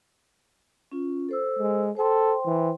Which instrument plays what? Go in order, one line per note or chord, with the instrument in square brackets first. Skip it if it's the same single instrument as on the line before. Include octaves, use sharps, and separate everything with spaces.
[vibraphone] C#4 F4
A4 C5 E6
[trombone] G#3
[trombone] A4 [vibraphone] C5 G5 C6
[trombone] E3